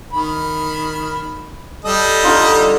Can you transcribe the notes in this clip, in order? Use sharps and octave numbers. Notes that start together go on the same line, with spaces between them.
D#3 B5
G3 A4 D#5
D3 D#4 F4